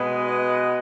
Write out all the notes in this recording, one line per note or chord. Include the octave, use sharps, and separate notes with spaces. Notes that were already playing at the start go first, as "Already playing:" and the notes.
Already playing: B2 G#3 B3
D#5